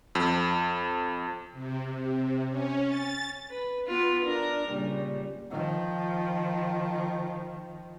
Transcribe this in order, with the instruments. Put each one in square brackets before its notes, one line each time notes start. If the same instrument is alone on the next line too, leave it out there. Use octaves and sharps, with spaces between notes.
[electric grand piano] F2
[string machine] C3
C3
C#4
A6
[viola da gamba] B4
B3 F4 B4
D4 A#4
A#2 C#3 G3
[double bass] D#3 F3